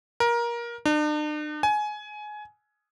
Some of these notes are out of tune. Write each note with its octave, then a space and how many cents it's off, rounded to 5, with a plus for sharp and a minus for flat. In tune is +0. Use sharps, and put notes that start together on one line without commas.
A#4 +20
D4 +45
G#5 +20